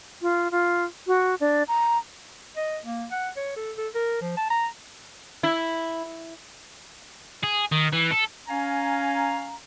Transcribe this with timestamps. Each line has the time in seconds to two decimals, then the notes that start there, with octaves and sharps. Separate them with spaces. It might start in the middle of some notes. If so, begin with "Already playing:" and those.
0.22 F4
0.51 F4
1.07 F#4
1.40 D4
1.68 A#5
2.57 D#5
2.84 A#3
3.11 F#5
3.37 C#5
3.56 A4
3.77 A4
3.95 A#4
4.21 F3
4.37 A5
4.50 A#5
5.43 E4
7.44 G#4
7.72 D#3
7.93 E3
8.12 A4
8.48 C#4 F5 G#5 A#5